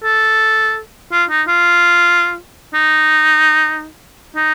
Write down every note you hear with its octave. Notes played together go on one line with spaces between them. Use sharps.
A4
F4
D#4
F4
D#4
D#4